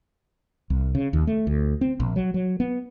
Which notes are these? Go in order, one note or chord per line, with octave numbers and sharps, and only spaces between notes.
C2
C#3
D#2
A3
D2
C4
A#1
F#3
F#3
B3